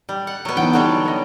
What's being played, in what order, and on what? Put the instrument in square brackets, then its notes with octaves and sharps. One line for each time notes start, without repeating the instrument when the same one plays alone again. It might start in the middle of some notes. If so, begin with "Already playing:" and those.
[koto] G3
F#5
F#3 B3
[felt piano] E3 B3 D#4 [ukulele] F#5 A5 [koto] G5
[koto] D3 F#3 G3 [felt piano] D#4
[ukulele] C#5 D#5